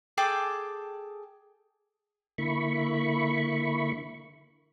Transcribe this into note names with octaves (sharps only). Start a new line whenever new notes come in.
G#4 A4 G5 D6
D3 A#3 E4 B5 C#6